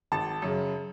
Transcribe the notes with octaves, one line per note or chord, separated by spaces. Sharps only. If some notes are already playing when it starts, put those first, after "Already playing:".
G#1 A5
F#2 C#3